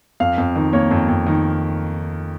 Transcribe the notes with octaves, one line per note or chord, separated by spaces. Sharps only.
F2 F5
F2
D#3
A#3 C#5
F2
F2
D#3